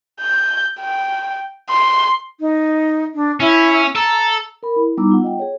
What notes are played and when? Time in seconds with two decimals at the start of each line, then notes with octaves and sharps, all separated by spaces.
0.22 G6
0.80 G5
1.70 C6
2.40 D#4
3.15 D4
3.40 C#4 E4
3.96 A4 A#5
4.63 A#4 B5
4.76 E4
4.97 G3 B3 D#4 A#5 D6 E6
5.11 F4 F#5
5.24 D#5 G5
5.39 G#4 C#5